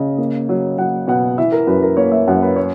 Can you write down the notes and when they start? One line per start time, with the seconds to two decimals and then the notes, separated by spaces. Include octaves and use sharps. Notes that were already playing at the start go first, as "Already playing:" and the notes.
Already playing: C#3 D#5
0.18 A#3
0.49 F#3
0.78 F#3 F#5
1.08 B2 F#5
1.38 E3 E5
1.52 A#4
1.67 F#2 B4
1.82 A#4
1.97 A#3 C#5
2.12 E5
2.28 F#2 F#5
2.42 B4
2.56 C#5